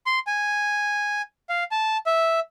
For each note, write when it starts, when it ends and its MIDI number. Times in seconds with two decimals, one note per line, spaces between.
0.06 0.19 84
0.27 1.22 80
1.49 1.64 77
1.71 1.97 81
2.06 2.40 76